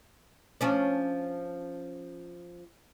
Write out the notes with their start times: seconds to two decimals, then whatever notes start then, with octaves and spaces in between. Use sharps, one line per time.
0.61 F3 C#4 D4